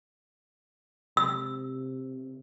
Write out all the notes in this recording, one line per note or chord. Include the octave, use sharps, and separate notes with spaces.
C3 E6